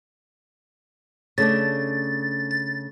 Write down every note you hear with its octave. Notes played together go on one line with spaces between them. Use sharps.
C#3 A3 D4 A6
A6